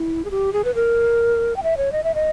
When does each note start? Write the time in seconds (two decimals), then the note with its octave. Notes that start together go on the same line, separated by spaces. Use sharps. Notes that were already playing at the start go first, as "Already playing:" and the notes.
Already playing: E4
0.25 G#4
0.31 G4
0.53 G#4
0.65 B4
0.75 A#4
1.56 G5
1.63 E5
1.77 C#5
1.92 D#5
2.04 E5
2.15 D#5